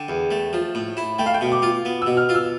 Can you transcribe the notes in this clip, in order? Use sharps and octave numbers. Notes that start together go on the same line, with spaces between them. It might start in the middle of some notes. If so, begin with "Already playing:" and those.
Already playing: D3 G5
E2
A3
F3
A2
E4
A3 G5
F5
G5
B2
D6
F4
B3
B2 E6
F6
F4
E6